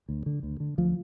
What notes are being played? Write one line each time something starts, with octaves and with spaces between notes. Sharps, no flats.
D2
D3
D2
D3
D2 F3